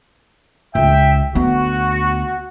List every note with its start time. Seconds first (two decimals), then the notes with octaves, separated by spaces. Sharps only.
0.75 C#2 E5 G5
1.35 D2 B3 F#4